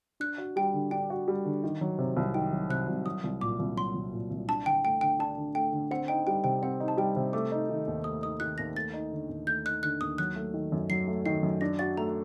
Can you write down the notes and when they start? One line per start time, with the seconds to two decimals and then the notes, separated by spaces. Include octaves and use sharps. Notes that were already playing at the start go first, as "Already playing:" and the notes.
0.20 D4 F#6
0.38 F#4
0.56 G3 G5
0.73 D3
0.91 D4 G5
1.10 F#4
1.28 G3
1.45 D3
1.64 D#3
1.81 F#3
1.98 C3
2.17 C2
2.34 D#3 G5
2.53 F#3
2.70 C3 F#6
2.88 C2
3.06 F#3 D#6
3.24 C2
3.41 A#2 D6
3.59 C2
3.77 F#3 C6
3.94 C2
4.13 A#2
4.31 C2
4.48 D4 A5
4.66 D3 G5
4.84 A3 G5
5.01 D3 G5
5.19 D4 A5
5.37 D3
5.55 A3 G5
5.73 D3
5.91 C4 F#5
6.08 D#4 G5
6.27 G3 G5
6.44 C3 G5
6.62 C4 F#5
6.80 D#4
6.88 A5
6.97 G3 G5
7.16 C3
7.33 A3 D6
7.52 D#4
7.70 D#3
7.87 D#2
8.04 A3 D#6
8.22 D#4 D#6
8.40 D#3 F#6
8.58 D#2 A#6
8.75 A3 A6
8.94 D#4
9.12 D3
9.29 D#2
9.47 A3 G6
9.65 D#4 F#6
9.83 D3 F#6
10.01 D#2 D#6
10.18 F#3 F#6
10.36 A3
10.54 D#3
10.72 F#2
10.90 F#3 C7
11.07 A3
11.26 D#3 C7
11.43 F#2
11.61 D4 A#6
11.79 F#4 A6
11.97 A3 A#5